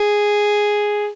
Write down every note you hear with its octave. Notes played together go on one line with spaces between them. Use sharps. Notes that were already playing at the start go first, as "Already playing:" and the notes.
Already playing: G#4